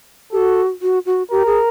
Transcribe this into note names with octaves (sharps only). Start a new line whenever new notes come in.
F#4 G4 A4
F#4
F#4
G4 A#4
G#4